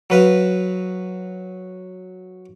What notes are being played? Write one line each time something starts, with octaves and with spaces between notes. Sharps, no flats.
F#3 B4 F5